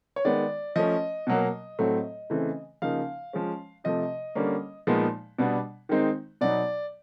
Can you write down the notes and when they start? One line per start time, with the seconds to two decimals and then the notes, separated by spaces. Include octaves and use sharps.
0.16 C#5
0.25 D#3 G#3 B3 D5
0.76 F3 A3 C#4 D#5
1.27 B2 F#3 A#3
1.79 A2 F#3 A3 C4
2.30 C#3 E3 A3 C4
2.82 C#3 F3 A#3 D#4 F5
3.33 F3 G#3 C#4
3.84 C3 F3 A3 D#5
4.35 D3 G3 A#3 C#4
4.87 A#2 F3 G#3 B3 D#4
5.39 B2 G3 B3 D4
5.89 D#3 G#3 C4 D#4
6.41 B2 F#3 B3 D#4 D5